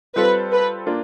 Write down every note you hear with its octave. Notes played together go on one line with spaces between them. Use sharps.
G3 C4 F4 A4 B4 C5
B4
A#3 D4 F4